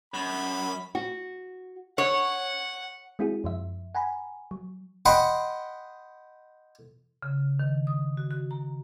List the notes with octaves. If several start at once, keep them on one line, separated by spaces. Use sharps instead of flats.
F#2 B5
F#4
C#5 F#5
G#3 C4 E4 F#4 G#4
F#2 F3 E5
F#5 G#5 A#5 B5
F#3
D#5 F#5 G5 B5 C6
C#3
D#3
D#6
F#4
F#4
A#5